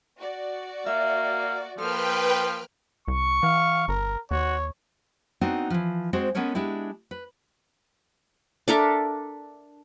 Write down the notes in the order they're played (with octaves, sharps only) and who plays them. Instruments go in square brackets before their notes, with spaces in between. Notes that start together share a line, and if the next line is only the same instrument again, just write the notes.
[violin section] F#4 D5
[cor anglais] A#3 [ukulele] E5
[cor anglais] F3 [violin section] A#3 F6 [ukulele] A4 [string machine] B4 G5
[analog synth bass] C2 [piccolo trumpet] C#6
[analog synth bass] E3 [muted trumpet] F5
[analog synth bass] G1 [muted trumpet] A#4
[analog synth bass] D#2 [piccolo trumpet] F#4 [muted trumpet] C#5
[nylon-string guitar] B3 C4 D4 D#4 F#4
E3 F3
G#3 C4 F#4 C5
G#3 B3 C#4 A4 A#4 C#5
G#3 D4 E4 G4
B4
[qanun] D4 A4 A#4 E5